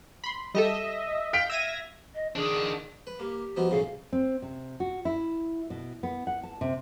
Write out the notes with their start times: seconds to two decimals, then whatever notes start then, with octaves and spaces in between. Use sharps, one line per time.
0.24 B5 C6
0.54 G3 G4 A4 D#5 E5
1.33 F5 G5 B6 D7
1.50 E5 E6 G#6 A#6 D#7
2.15 D#5
2.36 D#3 D4 G#4
3.07 B4
3.20 A#3 G4
3.56 F3 B3 D#4 F#4
3.71 B1 A2 C#3 G#4 F5
4.13 C4
4.42 C3
4.80 F#4
5.05 E4
5.70 B2
6.03 B3
6.27 F#5
6.43 A5
6.61 C3